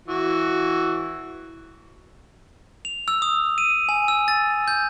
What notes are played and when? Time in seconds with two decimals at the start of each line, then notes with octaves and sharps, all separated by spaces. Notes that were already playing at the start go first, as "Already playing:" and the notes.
0.08 E3 F#4
2.85 F7
3.08 E6
3.22 D#6
3.58 D#7
3.89 G#5
4.08 E6
4.28 A6
4.68 G6